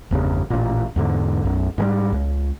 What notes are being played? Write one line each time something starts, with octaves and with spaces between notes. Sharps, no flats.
G1 E2 G2 C#3
A1 A#2
E2 G#2 D3
B1 F#2
G#2 D#3 G3
C#2